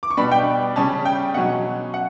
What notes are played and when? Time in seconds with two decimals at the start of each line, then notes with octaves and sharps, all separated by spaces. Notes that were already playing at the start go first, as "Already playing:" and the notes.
0.03 D6
0.10 C#6
0.17 B2 G3 B3 D4 B5
0.32 G5
0.76 C#3 G3 C#4 A5
1.05 G5
1.34 B2 F#3 C#4 F#5
1.94 F#5